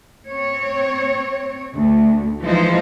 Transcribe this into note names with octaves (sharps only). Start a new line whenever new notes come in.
C4 C#5
D2
E3 F3 G#3 D#4 F4 C5